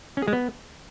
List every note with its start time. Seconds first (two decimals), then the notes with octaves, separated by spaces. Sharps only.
0.17 C#4
0.22 G#4
0.28 G#3
0.33 B3